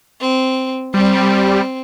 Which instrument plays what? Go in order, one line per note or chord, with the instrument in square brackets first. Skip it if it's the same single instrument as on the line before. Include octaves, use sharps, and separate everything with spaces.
[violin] C4
[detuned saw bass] G3 [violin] C4